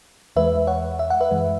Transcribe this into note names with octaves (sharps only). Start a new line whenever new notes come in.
E2 E3 G#3 B4 E5
C#5 F#5
E5
F#5
B4 E5
F#2 E3 G#3